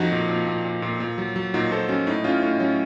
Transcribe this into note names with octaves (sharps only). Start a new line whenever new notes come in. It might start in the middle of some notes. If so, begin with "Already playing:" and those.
Already playing: F2 F3 D#4 F#4
A#2
A#2
A#2
A#2
A#2
A#2
F#3
F#3
A#2 D#4 F#4
A#2 A4 C5
F#3 C#4
A2 D#4
A2 C#4 F4
A2 D#4
F#3 C#4